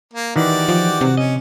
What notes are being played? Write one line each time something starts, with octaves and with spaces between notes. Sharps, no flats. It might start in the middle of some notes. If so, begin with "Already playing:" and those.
A#3
D#3 E3 F#4 G4 D5
F3
C3
C#4 D#5